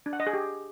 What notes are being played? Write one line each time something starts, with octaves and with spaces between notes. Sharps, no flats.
D4
F#5
D#5
G#4
G4